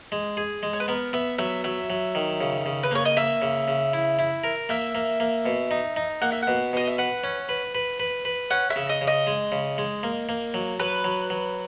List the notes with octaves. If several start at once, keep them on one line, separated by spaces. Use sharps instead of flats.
G#3
G#4
G#3
C#5
B4
B3 A#4
B3 E5
F#3 E5
F#3 E5
F#3
D#3
C#3
C#3
B4
A#3 C#5
D#5
A#3 E5
C#3
C#3
E4
E4
A#4
A#3 E5
A#3
A#3
B2
D#4
D#4
A#3 F#5
E5
B2 F#5
B2 D#5
E5
B4 F#5
C#4
B4
B4
B4
B4
C#4 F#5
E5
C#3
D#5
C#3
D#5
G#3
C#3
G#3
A#3
A#3
F#3
F#3 B4
F#3
F#3